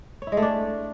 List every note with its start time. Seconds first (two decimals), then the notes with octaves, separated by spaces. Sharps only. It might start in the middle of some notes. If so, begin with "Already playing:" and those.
0.22 C#5
0.27 E4
0.32 G#3
0.37 A3
0.42 D4